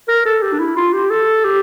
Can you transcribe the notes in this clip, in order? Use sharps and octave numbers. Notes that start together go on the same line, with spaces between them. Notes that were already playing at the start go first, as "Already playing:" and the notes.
A#4
A4
G4
D4
E4
F4
G4
A4
G4